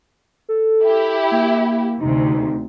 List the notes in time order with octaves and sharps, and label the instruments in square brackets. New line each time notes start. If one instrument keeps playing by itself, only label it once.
[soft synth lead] A4
[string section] E4 G4
[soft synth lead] A#3
[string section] D2 C3 [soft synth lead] D#4